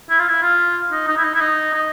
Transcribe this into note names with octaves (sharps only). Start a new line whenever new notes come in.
E4
F4
E4
F4
D#4
D#4
E4
D#4
E4
D#4
D#4